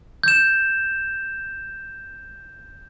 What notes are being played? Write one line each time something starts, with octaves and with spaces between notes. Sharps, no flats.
G6 E7